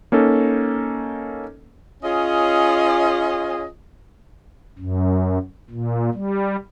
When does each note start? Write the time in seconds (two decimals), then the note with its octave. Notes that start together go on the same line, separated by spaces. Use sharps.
0.12 A#3 C#4 D#4 A4
2.03 C#4 F4 G#4 C#5 D#5
4.78 F#2
5.70 A#2
6.14 G3